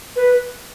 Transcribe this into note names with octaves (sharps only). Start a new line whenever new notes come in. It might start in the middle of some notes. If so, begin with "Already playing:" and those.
B4